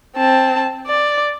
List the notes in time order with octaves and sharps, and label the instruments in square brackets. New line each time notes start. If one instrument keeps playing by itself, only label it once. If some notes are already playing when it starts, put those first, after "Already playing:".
[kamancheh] C4 A5
D5